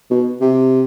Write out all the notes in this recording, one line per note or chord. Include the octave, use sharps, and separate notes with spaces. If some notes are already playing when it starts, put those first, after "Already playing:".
B2
C3